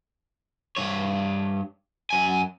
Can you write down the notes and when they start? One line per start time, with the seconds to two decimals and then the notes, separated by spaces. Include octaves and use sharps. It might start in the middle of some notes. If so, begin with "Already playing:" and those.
0.77 G2 C#5
2.10 F#2 G#5